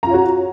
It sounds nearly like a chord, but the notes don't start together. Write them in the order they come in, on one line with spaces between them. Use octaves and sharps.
A#5 F4 C#5 F#4